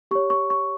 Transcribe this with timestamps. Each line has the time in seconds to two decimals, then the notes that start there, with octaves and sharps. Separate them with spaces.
0.11 G4 C#5 C#6
0.30 C#6
0.50 C#6